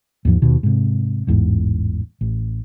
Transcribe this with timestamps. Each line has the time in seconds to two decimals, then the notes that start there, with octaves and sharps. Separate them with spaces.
0.25 D#2 G#2 F3
0.42 D#2 B2
0.63 G#2 C3
1.27 A1 E2 G#2
2.21 A1